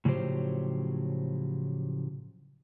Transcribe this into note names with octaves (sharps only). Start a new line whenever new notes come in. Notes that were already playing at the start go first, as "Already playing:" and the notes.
A2 C#3 F3 F#3 G4 C5